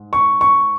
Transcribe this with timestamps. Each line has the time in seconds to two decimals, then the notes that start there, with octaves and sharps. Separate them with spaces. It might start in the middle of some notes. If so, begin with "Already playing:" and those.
Already playing: G#2
0.13 C#6
0.41 C#6